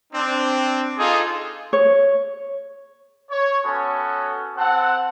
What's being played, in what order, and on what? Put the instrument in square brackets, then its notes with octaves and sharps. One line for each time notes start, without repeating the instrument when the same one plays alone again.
[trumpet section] C4 D4
D#4 F4 G#4 A4
[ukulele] C#5
[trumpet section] C#5
B3 C#4 F#4 A4
C4 A4 F#5